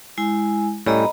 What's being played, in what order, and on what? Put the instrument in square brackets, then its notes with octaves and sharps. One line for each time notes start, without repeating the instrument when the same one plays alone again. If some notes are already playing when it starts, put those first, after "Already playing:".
[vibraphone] G#3 E4 G#5
[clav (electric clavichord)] A2 G3 C#4 [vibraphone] D#5 A#5 B5